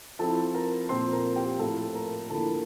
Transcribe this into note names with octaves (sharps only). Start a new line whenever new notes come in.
F3 C4 E4 A4 A5
A#4 A#5
A#2 F3 C4 C5 C6
A#4 A#5
G4 G5
A2 F3 A3 E4 A4 A5
A#4 A#5
D3 F3 A#3 E4 A4 A5